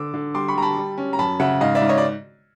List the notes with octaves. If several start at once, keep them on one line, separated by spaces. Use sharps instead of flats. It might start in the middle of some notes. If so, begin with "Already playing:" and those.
Already playing: D3 D6 E6
D3
G3 C6 D6
B5 C#6
G3 A#5
A5 B5
G3
C#4
A#5
F#2 A5 B5
C#3 E5 F#5
G#2 D#5 F5
D5 E5
G#2
C#5 D#5
D5